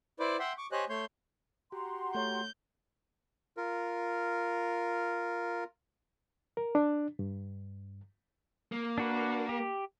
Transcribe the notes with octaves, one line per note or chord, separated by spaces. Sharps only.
E4 B4 C5 D5 D6
E5 F#5 G5 C6
C#6 D6
G4 C5 C#5 D#5 G#5 F#6
A3 C#5 C6 G6
F#4 G4 F#5 A#5 C6
A3 C#5 G6
F4 A#4
A#4
D4
G2
A#3
D4 F#4 B4
G4